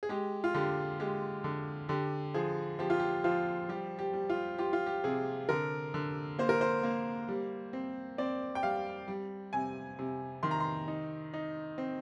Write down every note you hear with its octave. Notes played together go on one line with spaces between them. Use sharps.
G#4
G#3 G4
F4
D3 G4
G#3 G4
D3
D3 G4
F3 G#4
F3 G4
F4
G4
F3 F4
G3 G4
G4
G3
F4
F4 G4
F4
G4
C3 G#4
D3 A#4
D3
A#3 C5
A#4
C5
A#3
G3
C4
C4 D5
G5
G3 F5
G3
C3 G#5
C3
D#3 C6
A#5
C6
D#4
D#4
C4